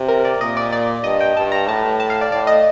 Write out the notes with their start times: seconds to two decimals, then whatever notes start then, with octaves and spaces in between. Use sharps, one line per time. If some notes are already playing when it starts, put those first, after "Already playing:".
Already playing: C3
0.08 A#4
0.25 D5
0.41 A#2 D#5
0.57 D5
0.73 D5
1.04 G2 D#5
1.20 G5
1.36 G2 A5
1.52 A#5
1.68 A2 A5
2.00 A5
2.10 F5
2.21 D5
2.32 A2 D5
2.47 D#5